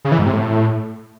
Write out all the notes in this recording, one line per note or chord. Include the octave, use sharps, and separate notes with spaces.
C#3
E3
G#2
C3
A2